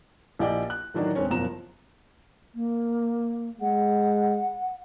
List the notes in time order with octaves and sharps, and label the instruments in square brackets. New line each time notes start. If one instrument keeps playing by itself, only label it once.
[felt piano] A#1 E4 G4 D5 D#5 G5
F#6
A2 D#3 E3 F#3 D4 D#4
E1 C4 C#4 C#5
F#1 B2 F3 A#5 E7
[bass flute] A#3
[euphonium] G#3 [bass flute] F#5